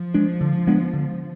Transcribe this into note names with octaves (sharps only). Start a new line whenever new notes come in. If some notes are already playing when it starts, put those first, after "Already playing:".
Already playing: F3
G#3 D4
D3
G#3 B3 D4
D3